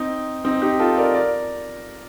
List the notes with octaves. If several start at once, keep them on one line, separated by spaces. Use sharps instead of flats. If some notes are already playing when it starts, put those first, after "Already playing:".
Already playing: C4 D#4
C4 D#4
D#4 G4
F4 A4
A#4 D5
A#4 D5